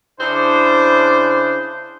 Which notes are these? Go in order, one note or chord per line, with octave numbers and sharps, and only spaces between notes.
C#3 D4 E4 C5